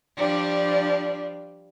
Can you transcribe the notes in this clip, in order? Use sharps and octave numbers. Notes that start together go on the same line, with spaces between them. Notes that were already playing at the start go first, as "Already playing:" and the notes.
F3 G3 D4